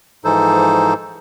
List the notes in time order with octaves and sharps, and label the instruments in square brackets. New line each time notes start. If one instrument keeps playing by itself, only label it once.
[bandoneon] G#2 E3 F3 D#4 A4 C5